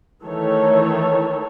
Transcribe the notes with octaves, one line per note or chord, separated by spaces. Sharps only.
D#3 E3 A3 A4 C#5